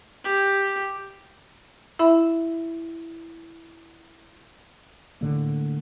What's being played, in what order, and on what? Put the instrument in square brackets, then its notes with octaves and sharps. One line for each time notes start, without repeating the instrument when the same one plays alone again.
[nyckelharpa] G4
[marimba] E4 E5 B5
[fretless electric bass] A2 D3 A#3